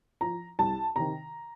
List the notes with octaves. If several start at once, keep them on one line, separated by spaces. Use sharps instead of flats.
F3 A#5
C2 A5
C3 D#3 A#5